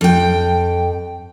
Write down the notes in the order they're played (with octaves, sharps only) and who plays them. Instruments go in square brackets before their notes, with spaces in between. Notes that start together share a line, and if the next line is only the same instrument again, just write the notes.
[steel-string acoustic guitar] F2 G5